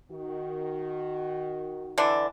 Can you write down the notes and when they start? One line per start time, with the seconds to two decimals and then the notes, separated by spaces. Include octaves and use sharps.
0.12 D#3 F#4
1.98 D3 E3 D4